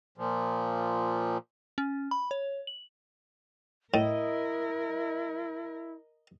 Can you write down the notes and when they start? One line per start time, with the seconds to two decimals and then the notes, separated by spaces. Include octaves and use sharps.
0.18 A#2 F3
1.78 C#4
2.11 B5
2.31 C#5
2.67 F#7
3.94 A2 E4 A#4 D#5